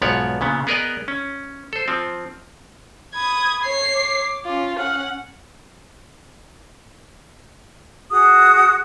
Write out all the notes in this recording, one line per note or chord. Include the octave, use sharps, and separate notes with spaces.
B1 G#2 F3 B3 C#5 D5
A#2 C#3 B3
B3 G#4 A#4 B4 D5 D#5
C#4
A4 C5
F3 C4
B5 D#6 G#6
C#5 C7
D6
C#4 F4
C#4 F#5 F6
F#4 G#4 D#6